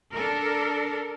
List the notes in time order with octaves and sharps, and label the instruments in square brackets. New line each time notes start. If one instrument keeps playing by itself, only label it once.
[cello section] D4 A4 A#4